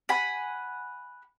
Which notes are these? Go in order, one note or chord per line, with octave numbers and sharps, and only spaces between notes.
F#5 G#5 B5